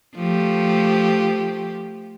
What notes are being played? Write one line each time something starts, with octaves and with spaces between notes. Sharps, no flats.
F3 A3 G4